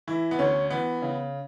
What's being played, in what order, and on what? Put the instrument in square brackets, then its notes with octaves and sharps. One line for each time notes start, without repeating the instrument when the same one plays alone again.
[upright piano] E3 E4
B3
D2 C#4
E3 B3
C#3